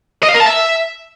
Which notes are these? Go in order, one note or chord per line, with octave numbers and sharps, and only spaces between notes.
D#5
F5
A#4
A5
E5